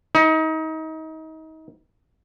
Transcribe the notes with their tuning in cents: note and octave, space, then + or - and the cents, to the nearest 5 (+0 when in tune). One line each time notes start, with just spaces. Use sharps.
D#4 +30